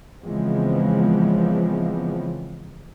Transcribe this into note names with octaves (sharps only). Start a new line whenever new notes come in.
C#3 E3 F3 G#3 B3 C4